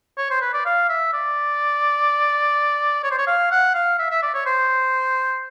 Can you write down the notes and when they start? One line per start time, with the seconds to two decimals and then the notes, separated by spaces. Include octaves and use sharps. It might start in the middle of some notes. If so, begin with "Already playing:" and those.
0.18 C#5
0.31 C5
0.42 B4
0.54 D5
0.66 F5
0.89 E5
1.14 D5
3.04 C#5
3.11 C5
3.18 C#5
3.27 F5
3.52 F#5
3.75 F5
3.99 E5
4.11 E5
4.23 D5
4.35 C#5
4.46 C5